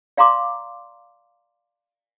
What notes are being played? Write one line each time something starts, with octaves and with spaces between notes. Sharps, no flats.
D5 F5 A#5 C6 D6